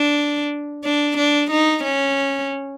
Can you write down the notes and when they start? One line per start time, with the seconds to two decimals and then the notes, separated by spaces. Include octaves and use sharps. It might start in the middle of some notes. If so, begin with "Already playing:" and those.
Already playing: D4
0.84 D4
1.18 D4
1.51 D#4
1.84 C#4